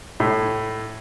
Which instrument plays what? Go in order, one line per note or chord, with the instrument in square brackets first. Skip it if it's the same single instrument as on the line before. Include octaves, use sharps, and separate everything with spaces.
[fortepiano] A2